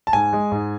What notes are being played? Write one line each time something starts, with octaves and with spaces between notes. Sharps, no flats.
A5
G#2 G#5
G#3
G#2